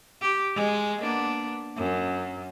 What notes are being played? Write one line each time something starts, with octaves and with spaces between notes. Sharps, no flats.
G4
G#3
A#3 B3 D4
F#2